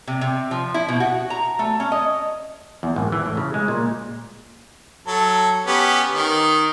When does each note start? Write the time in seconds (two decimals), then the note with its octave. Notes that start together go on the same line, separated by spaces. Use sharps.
0.07 C3
0.21 C3
0.51 F3
0.74 E4
0.88 B2
1.00 F#4
1.30 A#5
1.59 A3
1.80 C#4
1.92 D#5
2.83 E2
2.96 G#1
3.12 E3
3.26 A2
3.37 C#3
3.54 G#3
3.68 A#2
5.07 F#3 A4
5.67 B3 C#4 G4
6.15 D#3